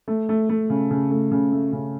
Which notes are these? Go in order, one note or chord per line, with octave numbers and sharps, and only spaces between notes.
A3
A3
A3
C#3
C#3
A3
C#3
A3
C#3